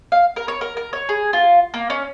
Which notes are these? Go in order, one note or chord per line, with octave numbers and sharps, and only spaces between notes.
F5
A#4
C#5
A#4
A#4
C#5
G#4
F4
A#3
C#4